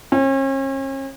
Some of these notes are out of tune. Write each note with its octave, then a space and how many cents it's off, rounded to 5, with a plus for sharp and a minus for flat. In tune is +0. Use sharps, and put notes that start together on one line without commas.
C#4 -40